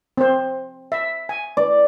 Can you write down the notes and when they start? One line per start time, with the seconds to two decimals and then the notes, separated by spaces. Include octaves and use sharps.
0.18 C4 C5
0.92 E5
1.29 G#5
1.57 D5